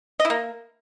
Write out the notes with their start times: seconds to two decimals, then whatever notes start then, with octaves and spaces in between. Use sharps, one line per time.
0.20 D#5
0.25 E4
0.30 A#3